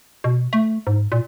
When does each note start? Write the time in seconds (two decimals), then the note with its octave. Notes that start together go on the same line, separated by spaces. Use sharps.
0.24 B2
0.53 A3
0.87 G#2
1.12 A#2